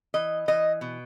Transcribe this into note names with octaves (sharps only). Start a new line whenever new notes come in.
E3 D#5
E3 D#5
B2